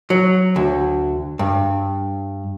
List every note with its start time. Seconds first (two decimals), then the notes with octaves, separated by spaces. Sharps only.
0.10 F#3
0.56 D2
1.39 G2